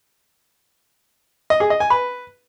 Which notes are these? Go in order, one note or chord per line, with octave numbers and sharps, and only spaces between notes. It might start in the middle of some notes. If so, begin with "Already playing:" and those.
D#5
G#4
D#5
G#5
B4